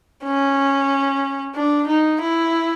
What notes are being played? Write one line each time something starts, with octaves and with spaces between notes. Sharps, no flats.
C#4
D4
D#4
E4